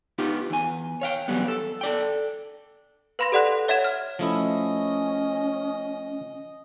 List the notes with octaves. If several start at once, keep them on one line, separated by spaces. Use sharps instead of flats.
B3 D#4 F4 G4
E2 G#5
C#5 F5 G5
E2 B2 F#3 G3 B3
A4
A4 D5 G5
B4 F5 B5 C6 A#6
G4 A4 D5 F#5 C6 F#6
C#5 E5 F#5 G#6 E7
F6
F3 A3 C#4 E4 D#5